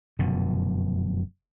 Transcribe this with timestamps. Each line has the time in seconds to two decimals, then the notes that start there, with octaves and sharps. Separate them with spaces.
0.19 F1 F#2 B2 D3